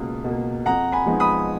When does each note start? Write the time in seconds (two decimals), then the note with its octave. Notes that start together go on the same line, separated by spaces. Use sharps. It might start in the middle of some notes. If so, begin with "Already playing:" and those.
Already playing: C#2 B2 A#3
0.24 B2 A#3
0.66 F2 F#5 A#5
0.92 G#5 B5
1.06 F3 G#3 B3 D#4
1.20 B5 D#6